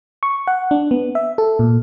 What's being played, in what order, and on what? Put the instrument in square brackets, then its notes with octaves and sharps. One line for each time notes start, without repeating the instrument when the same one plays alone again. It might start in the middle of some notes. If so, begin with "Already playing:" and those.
[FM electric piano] C#6
F#5
D4
B3
E5
A4
A#2